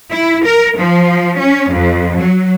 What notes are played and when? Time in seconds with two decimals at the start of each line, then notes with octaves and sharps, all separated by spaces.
0.12 E4
0.45 A#4
0.78 F3
1.38 C#4
1.71 F2
2.18 F#3